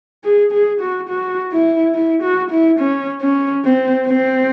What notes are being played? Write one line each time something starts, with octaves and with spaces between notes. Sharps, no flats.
G#4
G#4
F#4
F#4
E4
E4
F#4
E4
C#4
C#4
C4
C4